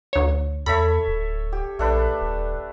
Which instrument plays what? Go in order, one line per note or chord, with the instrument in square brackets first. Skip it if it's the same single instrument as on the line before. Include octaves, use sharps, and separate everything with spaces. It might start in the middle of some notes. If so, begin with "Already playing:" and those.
[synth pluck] D2 C#5
[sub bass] E2 [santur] A4 C#5 E5 [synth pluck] B5
[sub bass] D1
[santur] G4
[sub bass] A#1 [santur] A3 D4 B4
[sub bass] D#1